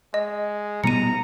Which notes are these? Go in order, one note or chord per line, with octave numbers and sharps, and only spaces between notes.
G#3 D#5
B2 G3 B3 A#5 C#7 D#7